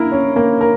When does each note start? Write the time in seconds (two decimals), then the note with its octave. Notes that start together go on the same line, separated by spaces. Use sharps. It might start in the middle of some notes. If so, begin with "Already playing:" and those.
Already playing: A#3 E4 A#4
0.12 C#4
0.36 A#3
0.61 A#4